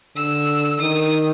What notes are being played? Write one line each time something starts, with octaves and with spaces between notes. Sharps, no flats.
D3 E6
D#3 D#6